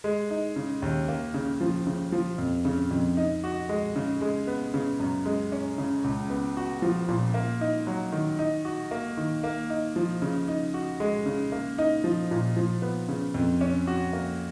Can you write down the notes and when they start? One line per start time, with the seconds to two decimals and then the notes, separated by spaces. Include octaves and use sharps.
0.04 G#3
0.30 D#4
0.56 C#3
0.82 D#2
1.08 A#3
1.34 C#3
1.61 F3
1.87 C#3
2.12 F3
2.38 F2
2.65 C#3
2.91 F2
3.17 D#4
3.44 F#4
3.69 G#3
3.96 C#3
4.22 G#3
4.47 B3
4.74 C#3
5.00 F#2
5.26 G#3
5.52 C#4
5.78 C#3
6.04 C#2
6.30 B3
6.57 F#4
6.82 F3
7.08 A#2
7.34 A#3
7.61 D#4
7.87 F#3
8.12 D#3
8.39 D#4
8.65 F#4
8.91 A#3
9.17 D#3
9.43 A#3
9.70 D#4
9.96 F3
10.22 C#3
10.48 D#4
10.74 F#4
11.00 G#3
11.26 C#3
11.52 A#3
11.78 D#4
12.04 F3
12.31 A#2
12.56 F3
12.82 B3
13.09 C#3
13.34 F2
13.61 C#4
13.87 F#4
14.13 A#3